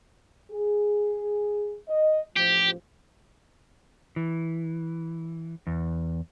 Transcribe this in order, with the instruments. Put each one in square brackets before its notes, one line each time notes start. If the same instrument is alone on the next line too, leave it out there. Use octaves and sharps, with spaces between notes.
[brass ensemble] G#4
D#5
[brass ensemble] A1 F3 [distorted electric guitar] G4
[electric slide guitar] E3
E2